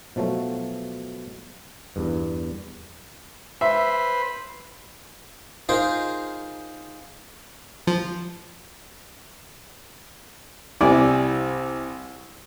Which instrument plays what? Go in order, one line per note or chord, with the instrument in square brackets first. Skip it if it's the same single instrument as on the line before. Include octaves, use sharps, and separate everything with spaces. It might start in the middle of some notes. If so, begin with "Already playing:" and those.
[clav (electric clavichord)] B2 F3 F#3 A3
E2 G2
[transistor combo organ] B4 C5 [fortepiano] E5
[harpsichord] D#4 F4 G#4 A#4 C5
[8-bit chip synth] F3
[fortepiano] C2 C3 E4 D5 G#5